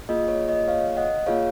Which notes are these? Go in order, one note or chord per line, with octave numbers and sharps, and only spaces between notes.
A#3 F4 G#4 D#5
C#5
D#5
C#5 F5
D#5 F#5
A#3 F4 G#4 C#5 F5